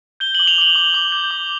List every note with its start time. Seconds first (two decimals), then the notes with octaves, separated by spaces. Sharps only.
0.20 G6 G7
0.35 D6 F#7
0.48 F7
0.58 D6 F#7
0.76 D6
0.94 D6
1.12 G6
1.31 D6